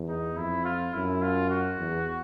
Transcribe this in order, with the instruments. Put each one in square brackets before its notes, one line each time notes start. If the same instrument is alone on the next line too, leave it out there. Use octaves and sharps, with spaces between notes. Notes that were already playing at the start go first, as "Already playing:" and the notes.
Already playing: [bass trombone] E2
[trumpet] D#4
[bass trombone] F2 [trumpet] E4
[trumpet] F4
[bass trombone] F#2 [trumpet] E4
[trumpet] F4
F#4
[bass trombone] E2